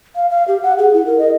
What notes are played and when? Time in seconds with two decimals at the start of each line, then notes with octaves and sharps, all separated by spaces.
0.16 F5
0.30 F5
0.48 G4
0.63 F#5
0.78 G#4
0.94 E4
1.06 A#4
1.19 D#5